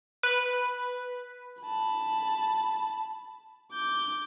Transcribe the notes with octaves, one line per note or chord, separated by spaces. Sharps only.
B4
A5 B5
D6 G6